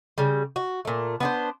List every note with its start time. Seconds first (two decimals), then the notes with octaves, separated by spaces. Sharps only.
0.18 C#3 G3
0.56 F#4
0.85 A#2 A3
1.20 B3 D4 C5